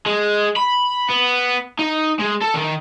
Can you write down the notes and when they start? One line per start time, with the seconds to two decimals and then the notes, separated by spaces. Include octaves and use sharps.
0.06 G#3
0.56 B5
1.09 B3
1.79 D#4
2.19 G#3
2.41 A4
2.54 D#3